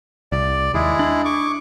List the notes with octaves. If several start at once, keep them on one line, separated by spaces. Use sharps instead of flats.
C2 D5
D#2 G#3 E4 G#4
D4
C#6 D6